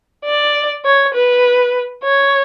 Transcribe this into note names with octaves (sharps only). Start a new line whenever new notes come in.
D5
C#5
B4
C#5